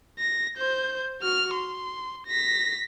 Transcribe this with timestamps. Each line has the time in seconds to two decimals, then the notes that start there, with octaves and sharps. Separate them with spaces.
0.19 A#6
0.58 C5 G6
1.21 F#4 F6
1.55 C6
2.27 A#6 B6